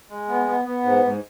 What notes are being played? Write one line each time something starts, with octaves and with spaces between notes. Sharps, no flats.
G#3
B3
B3
B3
G#2
G#2